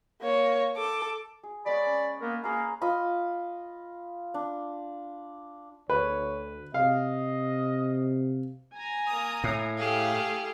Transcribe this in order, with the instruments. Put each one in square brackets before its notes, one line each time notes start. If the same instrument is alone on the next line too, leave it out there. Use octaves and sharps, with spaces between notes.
[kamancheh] A#3 C#5
A4 D6
[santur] G#4
[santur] G#3 B3 C#5 [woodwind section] D5 B5
[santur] C#4
[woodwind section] A#3 B3 A#4
[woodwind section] A#3 F5 [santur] G#4 B4 A#5
[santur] F4 D#5 B5
D4
[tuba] D2 [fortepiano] B4 [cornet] C#5
[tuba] C3 [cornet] D#5 [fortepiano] F5
[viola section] G#5 A#5
[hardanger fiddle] A#3 D#6
[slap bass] A2
[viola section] A3 E4 F5 [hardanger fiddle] G4 G#4